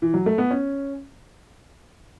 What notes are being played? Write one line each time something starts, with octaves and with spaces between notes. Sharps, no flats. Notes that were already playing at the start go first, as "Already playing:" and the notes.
E3
F#3
A3
B3
C#4